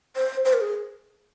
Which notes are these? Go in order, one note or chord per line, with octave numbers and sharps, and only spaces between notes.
C5
C5
A#4
G#4